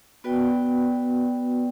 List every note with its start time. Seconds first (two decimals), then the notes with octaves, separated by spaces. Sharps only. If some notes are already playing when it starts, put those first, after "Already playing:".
0.24 B3 F#4 B4 D5 G5